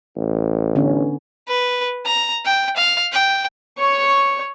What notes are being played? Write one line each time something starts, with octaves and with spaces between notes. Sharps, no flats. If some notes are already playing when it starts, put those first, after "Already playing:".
A1
D3 B3 C#4
B4
A#5
G5
F5
G5
C#5 C#6